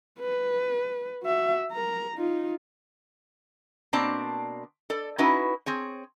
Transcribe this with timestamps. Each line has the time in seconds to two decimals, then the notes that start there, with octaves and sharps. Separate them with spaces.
0.19 B4
1.23 F#4 E5
1.72 A#4 A#5
2.16 D#4 F4
3.93 B2 A#3 C4 D4 D5 A5
4.90 A4 D5
5.18 C#4 D#4 E4 F#4 B4
5.66 C4 G#4 C#5